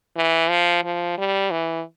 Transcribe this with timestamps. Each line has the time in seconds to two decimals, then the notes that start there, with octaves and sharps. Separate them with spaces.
0.17 E3
0.50 F3
0.84 F3
1.18 G3
1.51 E3